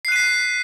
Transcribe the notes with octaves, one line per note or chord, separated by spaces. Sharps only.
F#6 B6 C7 D#7